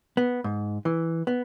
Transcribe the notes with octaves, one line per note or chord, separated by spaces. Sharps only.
B3
G#2
E3
B3